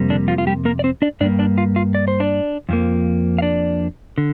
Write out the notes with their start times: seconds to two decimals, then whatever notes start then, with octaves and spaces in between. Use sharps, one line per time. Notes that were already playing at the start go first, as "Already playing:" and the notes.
Already playing: F2 C3 G3 A#3
0.10 D3 D4
0.28 F3 F4
0.38 F4
0.47 G3 G4
0.65 A#3 A#4
0.79 D5
0.84 C4 C5
1.02 D4 D5
1.20 G2 G3 A#3 D4 D5
1.39 D4 D5
1.58 F4 F5
1.76 F4 F5
1.95 D5
2.08 C5
2.20 D4 D5
2.69 F2 F3 A#3
3.38 F5
3.42 D4 D5
4.18 D3